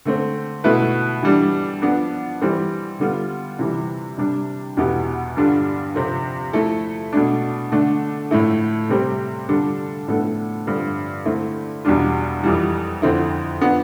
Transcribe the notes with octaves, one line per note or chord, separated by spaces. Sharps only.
D3 A3 C4
B2 A3 E4 B4
E3 G3 D4
F3 B3 D4
E3 G3 C4
D3 G3 B3 F4
C3 E3 G3
C3 G3 D4
E2 B2 B3 E4 G4
G2 D3 G3 D4 F4
C3 F3 C4 F4
F3 A3 E4 A4
B2 A3 D4
D3 A3 D4
A2 F3 A3 E4 A4
C3 G3 C4 G4
D3 G3 D4 F4 A4
A2 F3 B3 D4 A4
G2 D3 F3 C4
D3 A3 C4 E4
E2 B2 G3 D4 F4
F2 E3 G3
F2 D3 F3 C4 E4
F3 B3 D4